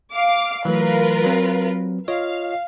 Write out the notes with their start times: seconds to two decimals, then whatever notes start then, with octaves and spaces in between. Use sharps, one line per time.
0.13 F5 D6
0.65 E3 F#3 A3 F4 A#4 B4
1.24 F#3 C4
2.08 F4 C#5 D#5 F5